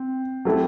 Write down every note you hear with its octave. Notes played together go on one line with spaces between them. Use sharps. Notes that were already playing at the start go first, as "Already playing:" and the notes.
Already playing: C4
F#3 A3 C4 E4 G4